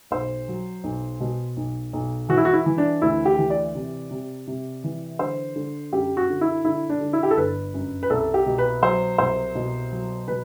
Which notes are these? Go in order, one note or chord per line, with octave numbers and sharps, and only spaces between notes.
B1 C5
F#3
B1
B2
B1
B1
E3 F#4
E4
F#4
E4
E3
D4
D2 E4
G4
E3
D5
C3
C3
C3
E3
D3 C5
D3
F#2 G4
F#4
D3
E4
D3 E4
D4
D3
E4
G4
A4
G1 B4
F#2
B4
C2 A4
G4
B2
B4
F#3 C5
C2 C5
B2
F#3
B2 B4